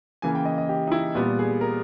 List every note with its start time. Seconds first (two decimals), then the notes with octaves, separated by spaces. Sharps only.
0.22 C#3 E3 A#3 G#5
0.35 G5
0.45 D#5
0.58 D#5
0.69 G4
0.87 D#4
0.92 E4
1.15 A#2 G3 B3
1.39 G#4
1.61 A#4